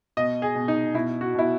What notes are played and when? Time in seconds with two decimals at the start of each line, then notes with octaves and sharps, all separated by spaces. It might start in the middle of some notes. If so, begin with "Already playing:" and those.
0.17 B2 D#5
0.42 G#4
0.55 B2
0.68 D#4
0.94 B2 E4
1.21 F#4
1.35 B2 E4